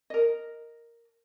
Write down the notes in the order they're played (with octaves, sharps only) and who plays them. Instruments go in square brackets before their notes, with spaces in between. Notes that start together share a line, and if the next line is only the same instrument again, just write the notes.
[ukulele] A#4 D#5